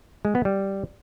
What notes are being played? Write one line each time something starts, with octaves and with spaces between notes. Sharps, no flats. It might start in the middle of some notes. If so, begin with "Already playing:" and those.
G#3
B3
G3